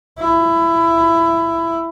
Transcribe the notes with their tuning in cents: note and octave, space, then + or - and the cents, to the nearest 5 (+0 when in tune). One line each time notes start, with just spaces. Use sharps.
E4 +15